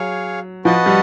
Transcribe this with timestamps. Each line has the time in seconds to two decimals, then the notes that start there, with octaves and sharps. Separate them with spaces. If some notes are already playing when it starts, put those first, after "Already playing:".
Already playing: F#3 G#4 C#5 F5
0.65 F3 F#4 B4 D#5 F#5 A5
0.86 G3